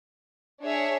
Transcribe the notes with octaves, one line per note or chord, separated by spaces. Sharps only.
D4 G#4 C#5 E5